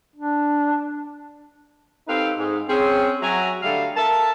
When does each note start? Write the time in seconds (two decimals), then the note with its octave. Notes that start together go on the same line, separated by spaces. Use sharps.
0.16 D4
2.08 C4 D#4 G4 A4 B4 F5
2.38 G#2
2.68 C4 C#4 G#4
3.21 F#3 F#4 E5 G#5 A#5
3.62 D3 G3 A3 F5
3.96 A4 A#4 E5 A5